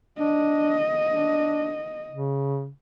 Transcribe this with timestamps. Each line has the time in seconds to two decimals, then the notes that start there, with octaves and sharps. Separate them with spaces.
0.19 D4 D#5
1.08 D4
2.11 C#3